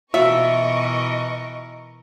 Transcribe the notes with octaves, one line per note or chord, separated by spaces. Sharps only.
B2 E3 F4 F#4 A#4 D#5 E5 C#6